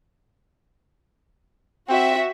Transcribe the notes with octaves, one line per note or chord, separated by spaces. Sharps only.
C4 F#4 E5